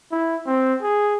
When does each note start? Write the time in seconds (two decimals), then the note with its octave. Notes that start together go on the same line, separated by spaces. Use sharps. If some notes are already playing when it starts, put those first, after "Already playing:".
0.12 E4
0.46 C4
0.83 G#4